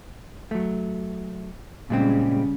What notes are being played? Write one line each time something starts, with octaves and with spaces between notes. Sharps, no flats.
F#3 A3
A#2 C#3 G3 G#3 C4